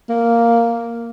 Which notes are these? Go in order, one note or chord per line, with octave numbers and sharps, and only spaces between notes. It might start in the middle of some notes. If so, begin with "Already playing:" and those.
A#3